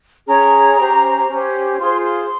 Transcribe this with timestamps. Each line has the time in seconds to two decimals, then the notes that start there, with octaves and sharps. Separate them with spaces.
0.27 C#4 G#4 C#5 A#5
0.79 C#4 G4 C5
1.29 C#4 G4 C5
1.79 F4 G#4 C5 C6
2.04 C6